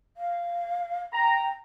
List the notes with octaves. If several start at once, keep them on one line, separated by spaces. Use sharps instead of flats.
F5
G5 A#5